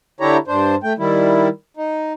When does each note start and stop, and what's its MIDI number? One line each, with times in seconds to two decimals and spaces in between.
0.20 0.37 50
0.20 0.37 62
0.20 0.37 64
0.20 0.37 67
0.20 0.37 73
0.20 0.37 82
0.48 0.75 43
0.48 0.75 62
0.48 0.75 72
0.83 0.93 57
0.83 0.93 79
0.98 1.48 51
0.98 1.48 55
0.98 1.48 64
1.77 2.13 63